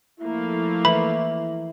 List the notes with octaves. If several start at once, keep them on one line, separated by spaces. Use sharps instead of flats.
F3 A3 A#3 E4
E3 B5